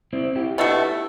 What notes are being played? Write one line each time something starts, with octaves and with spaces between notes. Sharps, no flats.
C4 E4
E4 G4
B2 A3 D4 F#4